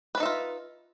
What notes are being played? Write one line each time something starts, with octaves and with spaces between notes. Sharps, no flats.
D4 D#4 F4 B4 E5